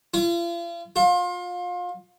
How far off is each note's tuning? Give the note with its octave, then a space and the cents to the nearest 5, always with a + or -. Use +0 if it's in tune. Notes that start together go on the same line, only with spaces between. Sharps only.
F4 -40
F4 +30